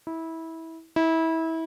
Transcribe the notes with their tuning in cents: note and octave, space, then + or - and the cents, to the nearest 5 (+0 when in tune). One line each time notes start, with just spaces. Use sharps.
E4 -20
E4 -25